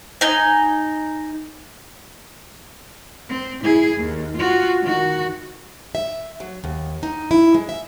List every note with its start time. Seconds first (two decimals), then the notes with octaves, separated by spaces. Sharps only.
0.21 D#4 G#5
3.30 C4
3.64 E4 G#4
3.97 D#2
4.37 F4 F#4
4.82 D#3 F#4
5.95 E5
6.40 F#3
6.64 D#2
7.03 D#4
7.31 E4
7.54 G#3
7.69 E5